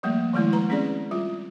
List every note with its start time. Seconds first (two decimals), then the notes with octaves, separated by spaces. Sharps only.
0.03 F3 G3 A3 A#3
0.33 D#3 F3 G#3 A3 E4
0.52 B4 A#5
0.69 A3 C4 C#4 G#4 D5
1.11 G3 F4